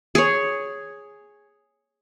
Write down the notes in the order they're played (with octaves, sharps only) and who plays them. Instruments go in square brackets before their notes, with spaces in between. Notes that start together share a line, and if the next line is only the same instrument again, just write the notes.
[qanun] G#4 C#5